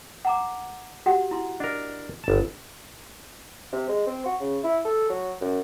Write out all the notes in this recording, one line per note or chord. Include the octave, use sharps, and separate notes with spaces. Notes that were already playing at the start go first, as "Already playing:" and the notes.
F#5 A#5 D6
F#4 G4 F#5
E4 C6
D4 A#4 D#5
G1 A5
C3
G#3
C4
F#4
C#3
E4
A4
F#3
F#2